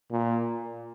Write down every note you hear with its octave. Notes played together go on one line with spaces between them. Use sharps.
A#2